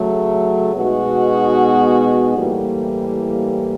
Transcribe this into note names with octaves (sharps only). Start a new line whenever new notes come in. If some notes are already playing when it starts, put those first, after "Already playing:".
Already playing: C#3 F#3 A3
B2 G#3 B3 D#4 F#4
A2 E3 G3 A#3